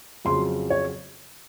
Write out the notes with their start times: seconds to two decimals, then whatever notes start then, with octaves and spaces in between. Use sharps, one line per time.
0.25 F2 C#3 F#3 C6
0.70 C#5